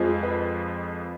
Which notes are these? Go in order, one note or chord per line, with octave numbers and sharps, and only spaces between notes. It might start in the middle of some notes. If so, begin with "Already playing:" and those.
Already playing: F2 F3 G#3
B4